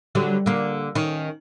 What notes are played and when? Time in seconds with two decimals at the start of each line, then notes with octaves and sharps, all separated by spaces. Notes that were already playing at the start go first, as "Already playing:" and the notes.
0.15 D3 F#3 G3
0.46 D3 A#3
0.95 D#3 C#4